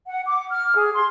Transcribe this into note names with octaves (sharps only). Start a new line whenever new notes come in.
F#5
D6
F6
G#4
C6